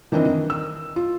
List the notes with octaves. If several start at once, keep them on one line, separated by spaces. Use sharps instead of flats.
D#3 E3 C4 D4 E4 D#5
D#3
E6
F4